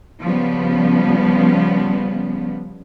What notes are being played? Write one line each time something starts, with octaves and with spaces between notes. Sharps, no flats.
C#3 F3 G3 B3